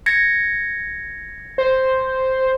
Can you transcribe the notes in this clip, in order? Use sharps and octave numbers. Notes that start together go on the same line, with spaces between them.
G#6 A#6 C#7
C5